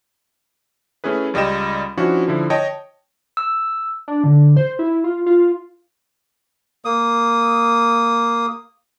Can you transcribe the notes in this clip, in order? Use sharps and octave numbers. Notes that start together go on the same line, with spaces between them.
A3 C#4 E4 G#4 B4
C#2 G3 D#5 G5 E7
F3 C#4 D4 E4 F#4
D3 F3 E4
C#5 D#5 G5 A5
E6
D4
D3
C5
E4
F4
F4
A#3 D#6